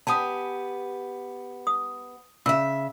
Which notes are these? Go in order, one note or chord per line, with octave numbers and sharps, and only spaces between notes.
B3 G4 G#5 A5 D#6
D#6
C#3 E5 E6